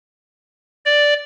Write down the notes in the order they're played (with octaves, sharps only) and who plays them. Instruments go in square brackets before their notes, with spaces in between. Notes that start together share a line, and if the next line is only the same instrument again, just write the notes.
[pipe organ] D5